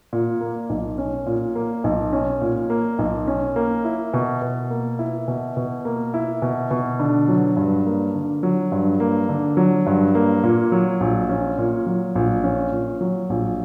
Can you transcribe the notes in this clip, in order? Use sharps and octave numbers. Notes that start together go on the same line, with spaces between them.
A#2
A#3
B1
C#4
A#2
A#3
B1
C#4
A#2
A#3
B1
C#4
A#3
E4
B2
B2
A#3
E4
B2
B2
A#3
E4
B2
B2
D3
F#3
G2
A#3
D3
F#3
G2
A#3
D3
F#3
G2
A#3
A#2
F#3
A#1
C#4
A#2
F#3
A#1
C#4
A#2
F#3
A#1